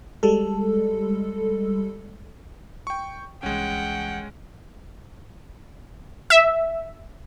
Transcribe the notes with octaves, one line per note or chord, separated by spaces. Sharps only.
G3 G#3 A4
G5 C#6
C2 E3 G#3 C#4 F#5 G5
E5